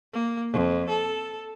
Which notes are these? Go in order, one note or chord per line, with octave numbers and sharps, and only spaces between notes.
A#3
F2
A4